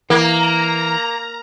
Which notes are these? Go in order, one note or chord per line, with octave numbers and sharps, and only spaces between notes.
E3 A#3 A#5